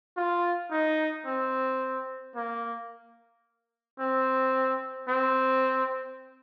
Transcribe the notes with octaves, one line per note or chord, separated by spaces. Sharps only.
F4
D#4
C4
A#3
C4
C4